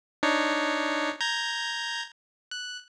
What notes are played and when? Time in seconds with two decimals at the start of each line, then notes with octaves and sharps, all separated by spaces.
0.23 D4 D#4 C#5
1.21 A#5 G6 G#6
2.51 F#6